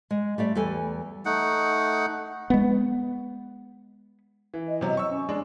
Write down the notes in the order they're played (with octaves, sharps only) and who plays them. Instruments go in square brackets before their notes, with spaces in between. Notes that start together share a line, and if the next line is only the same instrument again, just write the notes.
[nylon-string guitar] G#3
G3 A3 D5 E5
E2 G3 A4 G#5
[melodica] A3 D#4 F#5
[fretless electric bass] G#3 B3
[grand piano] E3
[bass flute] D#5
[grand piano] C3 F#3
C#6 E6
[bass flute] C#4
[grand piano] G#3 D4